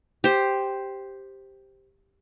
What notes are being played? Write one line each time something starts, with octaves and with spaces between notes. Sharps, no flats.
G4 C5